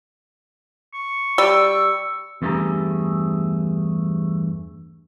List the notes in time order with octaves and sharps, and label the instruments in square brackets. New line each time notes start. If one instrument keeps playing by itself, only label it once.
[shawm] C#6
[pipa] G3 [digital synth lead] E6
[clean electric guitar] E2 G2 A3 G4 G#4 A#5